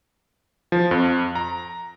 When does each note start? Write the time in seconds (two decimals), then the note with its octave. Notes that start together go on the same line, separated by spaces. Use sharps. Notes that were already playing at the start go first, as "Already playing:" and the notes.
0.72 F3
0.91 F2
1.35 A#5